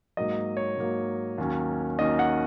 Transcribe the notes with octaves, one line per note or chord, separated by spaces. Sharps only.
G#2 F#3 A#3 D#5
C#5
G#2 F#3 A#3
D#2 D#3 F#3 C#4
D#2 D#3 F#3 C#4 D#5
F#5